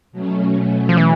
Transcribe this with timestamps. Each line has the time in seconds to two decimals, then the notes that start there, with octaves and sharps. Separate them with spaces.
0.12 B2 F#3 A3 C#4
0.89 F3
0.97 E3